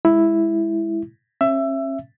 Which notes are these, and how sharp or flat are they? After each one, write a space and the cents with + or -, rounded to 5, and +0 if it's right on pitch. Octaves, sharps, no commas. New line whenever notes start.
G#3 +0 E4 +0
C#4 -40 E5 +15